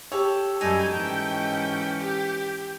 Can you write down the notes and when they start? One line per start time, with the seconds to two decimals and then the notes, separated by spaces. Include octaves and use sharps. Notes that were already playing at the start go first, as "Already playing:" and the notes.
0.12 G4 A4 C#5
0.61 F#2 G3 D#4 A4 G#5
0.94 G#2 E3 C#4 G5
2.00 G4